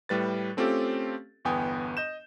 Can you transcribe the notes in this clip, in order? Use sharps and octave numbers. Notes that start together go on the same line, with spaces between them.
A2 G3 B4 A6
A3 C4 C#4 F4 G4 A4
G1 E2 B3 G5 G#5 D#6
D#5 G6 E7